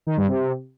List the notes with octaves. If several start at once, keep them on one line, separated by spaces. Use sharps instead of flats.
D#3
G2
C3